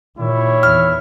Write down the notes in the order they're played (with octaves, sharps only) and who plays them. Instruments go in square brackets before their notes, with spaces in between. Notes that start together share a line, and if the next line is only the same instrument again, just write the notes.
[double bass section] A#2 D#3 [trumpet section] G3 E4 C#5
[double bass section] E2 [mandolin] F6